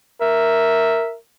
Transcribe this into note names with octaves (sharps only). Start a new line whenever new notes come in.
A#4 E5